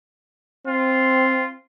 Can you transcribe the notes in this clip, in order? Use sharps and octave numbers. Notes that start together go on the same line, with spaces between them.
C4 F4